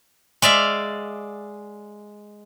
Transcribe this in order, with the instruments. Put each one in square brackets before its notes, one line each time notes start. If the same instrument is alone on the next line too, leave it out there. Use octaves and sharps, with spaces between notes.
[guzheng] G#3 D5 E5 F5